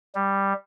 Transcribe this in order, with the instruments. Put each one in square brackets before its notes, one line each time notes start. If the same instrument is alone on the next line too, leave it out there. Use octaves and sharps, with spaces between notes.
[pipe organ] G3